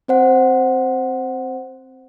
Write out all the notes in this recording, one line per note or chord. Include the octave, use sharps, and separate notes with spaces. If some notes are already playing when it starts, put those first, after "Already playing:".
C4 C5 F#5